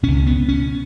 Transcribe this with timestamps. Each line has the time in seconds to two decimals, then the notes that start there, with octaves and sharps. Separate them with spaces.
0.03 C#2 B2 C#4
0.27 B3
0.49 C#4